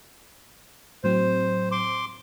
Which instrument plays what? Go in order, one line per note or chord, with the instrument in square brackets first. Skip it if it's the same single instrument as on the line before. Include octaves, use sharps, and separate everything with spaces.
[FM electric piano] A2 F#3 C4 [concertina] C5
[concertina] C6 D6